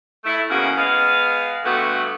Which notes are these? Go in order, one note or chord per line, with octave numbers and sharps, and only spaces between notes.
A3 E4
E2 C#3 A#3 C#4 F#4
G#3 B3 F5
G2 D3 A3 B3 F#4